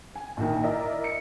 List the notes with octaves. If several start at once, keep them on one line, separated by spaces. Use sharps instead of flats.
G#5
A#1 D#3
E4 A#4 D5 D#5
C#7